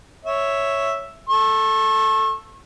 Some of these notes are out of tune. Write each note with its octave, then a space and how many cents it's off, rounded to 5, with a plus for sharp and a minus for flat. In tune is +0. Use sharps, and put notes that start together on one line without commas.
C#5 +0 E5 +0
A4 +0 C#6 -35